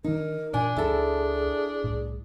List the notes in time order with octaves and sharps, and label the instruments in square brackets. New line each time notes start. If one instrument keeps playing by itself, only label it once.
[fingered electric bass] D#3 D4 [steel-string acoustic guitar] D#4 [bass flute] A#4
[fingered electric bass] A#2 [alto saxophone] D4 [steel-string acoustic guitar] G#5
[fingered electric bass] C#2 [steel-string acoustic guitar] E4 A4 [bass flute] G#4
[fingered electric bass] C2 A2